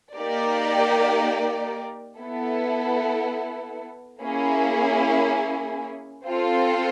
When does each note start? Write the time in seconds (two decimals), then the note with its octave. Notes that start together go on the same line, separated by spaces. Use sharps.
0.15 A#3 D#4 G4 A#4 D5
2.19 B3 E4 A4
4.22 A#3 C#4 E4 G#4
6.25 C4 F4 A4